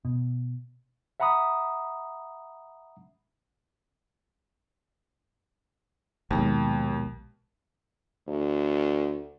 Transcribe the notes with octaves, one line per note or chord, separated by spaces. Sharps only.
B2
E5 F#5 A#5 B5 D#6
A#1 D#2 B2 G#3
D2